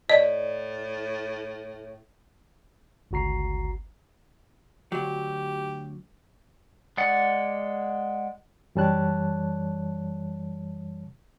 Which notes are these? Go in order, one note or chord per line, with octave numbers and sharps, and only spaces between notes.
A2 D5 D#5
G1 C#2 F#4 A#5 C7
D2 F#3 G4
G#3 D5 F#5
F#2 E3 G3 C#5 A5 F#6